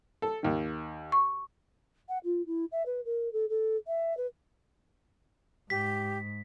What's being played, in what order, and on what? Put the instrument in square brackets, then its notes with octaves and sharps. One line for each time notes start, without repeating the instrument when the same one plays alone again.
[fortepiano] A4
D#2 D#3
[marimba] C#6
[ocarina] F#5
F4
E4
E5
B4
A#4
A4
A4
E5
B4
[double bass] G#2 [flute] G4 [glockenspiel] B6